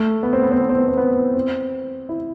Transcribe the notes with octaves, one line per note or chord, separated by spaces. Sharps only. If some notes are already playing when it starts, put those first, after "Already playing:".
Already playing: A3
B3
C4
B3
C4
B3
C4
B3
C4
B3
C4
E4